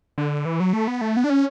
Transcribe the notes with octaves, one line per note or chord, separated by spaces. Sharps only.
D3
E3
F#3
A3
B3
A3
B3
D4
C#4